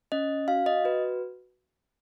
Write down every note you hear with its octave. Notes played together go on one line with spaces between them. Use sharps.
C#4 D#5
F#4 F5
D#5
F#4 B4